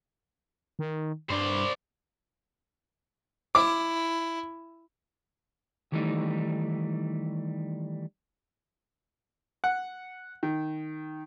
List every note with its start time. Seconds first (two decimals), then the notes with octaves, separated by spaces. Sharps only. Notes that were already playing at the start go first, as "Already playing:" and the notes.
0.79 D#3
1.30 G2 C5 D5
3.55 E4 D6
5.92 D#3 E3 G3 A3 D#4
9.64 F#5
10.43 D#3